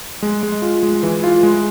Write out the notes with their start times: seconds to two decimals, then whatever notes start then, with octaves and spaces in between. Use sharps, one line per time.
0.23 G#3
0.43 G#3
0.62 F4
0.83 G#3
1.03 E3
1.24 F4
1.43 G#3